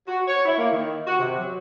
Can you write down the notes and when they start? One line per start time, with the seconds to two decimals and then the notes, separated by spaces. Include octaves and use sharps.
0.08 F#4
0.28 C#5
0.46 E4
0.58 A#3
0.72 D#3
1.07 F#4
1.19 C3
1.39 F#3